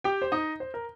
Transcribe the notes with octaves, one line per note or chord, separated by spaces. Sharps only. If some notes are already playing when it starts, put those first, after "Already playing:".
G4 G5
C5
D#4 D#5
C5
A#4